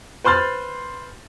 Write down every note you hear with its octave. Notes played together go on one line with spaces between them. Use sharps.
B4 C5 C6 F6 A6